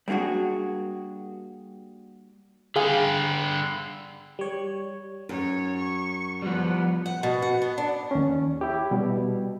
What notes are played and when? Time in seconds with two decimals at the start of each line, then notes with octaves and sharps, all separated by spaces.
0.08 G3 A#3 D4 F#4 G#4
2.76 D3 G3 G#4 F5 G#5
4.39 G3 C#5
5.29 F#2 C#5
5.78 C#6
6.42 F3 G3 B3
7.06 F#5
7.23 B2
7.42 F#5
7.62 B3
7.78 D4
8.11 D#2 C#4
8.61 E4 G4
8.91 B2 G3